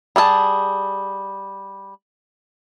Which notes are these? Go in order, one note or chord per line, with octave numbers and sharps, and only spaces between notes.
G3 G#4 A4 A5